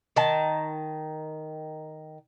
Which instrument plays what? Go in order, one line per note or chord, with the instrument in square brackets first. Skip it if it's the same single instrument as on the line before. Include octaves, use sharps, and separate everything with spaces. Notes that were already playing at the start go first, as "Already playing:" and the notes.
[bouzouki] D#3 A5